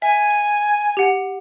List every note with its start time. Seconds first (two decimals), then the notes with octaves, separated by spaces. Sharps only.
0.02 E5 G#5
0.97 G4 F#5